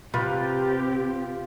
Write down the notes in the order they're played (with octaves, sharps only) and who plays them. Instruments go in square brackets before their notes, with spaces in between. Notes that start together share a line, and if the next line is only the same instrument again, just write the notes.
[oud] C3 [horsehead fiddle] C4 G4 [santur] F4 [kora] B4